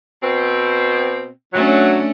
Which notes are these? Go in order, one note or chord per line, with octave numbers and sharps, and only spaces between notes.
B2 C4
F#3 A3 C#4 D4